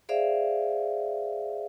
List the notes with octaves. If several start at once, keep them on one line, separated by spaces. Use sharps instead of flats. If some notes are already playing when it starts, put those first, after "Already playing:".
G#4 C5 D5 E5 F5